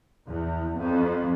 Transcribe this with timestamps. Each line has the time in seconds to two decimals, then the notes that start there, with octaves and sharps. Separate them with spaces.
0.26 E2
0.78 F2